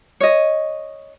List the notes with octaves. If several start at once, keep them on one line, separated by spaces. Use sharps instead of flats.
C#5 D#5